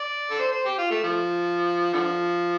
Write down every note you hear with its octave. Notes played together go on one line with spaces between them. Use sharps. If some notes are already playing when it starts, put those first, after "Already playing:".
Already playing: D5
A4
C5
C5
G4
F4
A3
F3
D3 F3